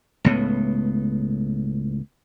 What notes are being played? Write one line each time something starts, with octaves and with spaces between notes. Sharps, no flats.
C#2 A2 B3